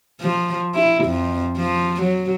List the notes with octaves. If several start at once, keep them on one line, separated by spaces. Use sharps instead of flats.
F3
E4
F2
F3
F#3